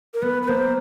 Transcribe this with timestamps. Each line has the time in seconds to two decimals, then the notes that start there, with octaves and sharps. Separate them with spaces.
0.14 A#4
0.22 B3 B4
0.43 B4
0.48 A#3 C5